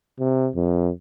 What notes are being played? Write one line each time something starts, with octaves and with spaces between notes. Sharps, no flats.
C3
F2